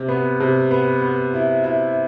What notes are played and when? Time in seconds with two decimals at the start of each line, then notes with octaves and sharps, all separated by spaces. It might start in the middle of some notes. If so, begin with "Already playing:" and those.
Already playing: C3
0.09 B3
0.40 C3
0.71 B3
1.02 B3
1.34 E4
1.64 E4